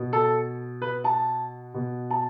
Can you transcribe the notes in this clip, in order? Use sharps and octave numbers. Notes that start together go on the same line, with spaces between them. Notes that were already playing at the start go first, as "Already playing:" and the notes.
Already playing: B2
A4
B4
A5
B2
A5